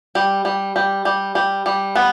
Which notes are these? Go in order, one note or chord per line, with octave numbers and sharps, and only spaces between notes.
G3
G3
G3
G3
G3
G3
B3